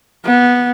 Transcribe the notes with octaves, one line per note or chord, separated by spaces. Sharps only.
B3